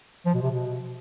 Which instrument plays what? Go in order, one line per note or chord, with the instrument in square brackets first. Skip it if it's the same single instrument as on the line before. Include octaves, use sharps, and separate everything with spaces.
[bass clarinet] F3
B2
C3
B2